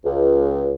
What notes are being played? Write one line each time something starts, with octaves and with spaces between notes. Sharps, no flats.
C#2